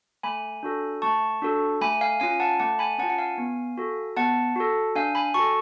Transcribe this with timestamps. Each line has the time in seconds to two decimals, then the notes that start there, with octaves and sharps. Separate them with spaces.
0.23 A3 G#5 B5
0.63 D4 F#4 A4
1.02 A3 A5 C#6
1.42 D4 F#4 A4
1.81 A3 G#5 B5
2.01 F5 G#5
2.20 C#4 F4 F5 G#5
2.40 F#5 A5
2.59 A3 F#5 A5
2.79 G#5 B5
2.99 C#4 F#5 A5
3.03 F4
3.10 F#5
3.18 F5 G#5
3.38 B3
3.78 F#4 A4
4.16 B3 F#5 A5
4.56 F#4 A4
4.95 D4 F5 G#5
5.15 G#5 B5
5.34 F#4 A4 A5 C#6